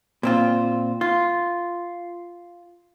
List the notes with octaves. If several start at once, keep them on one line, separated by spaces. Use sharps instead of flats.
A#2 C4 F4
F4